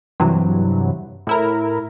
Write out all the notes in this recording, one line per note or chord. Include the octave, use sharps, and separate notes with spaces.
G2 C3 E3 F#3
A2 E4 A#4